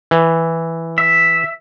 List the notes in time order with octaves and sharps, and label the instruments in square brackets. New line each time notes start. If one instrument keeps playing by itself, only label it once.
[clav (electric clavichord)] E3
[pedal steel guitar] E5